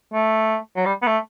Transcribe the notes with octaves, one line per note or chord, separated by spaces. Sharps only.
A3
F#3
G3
B3
A3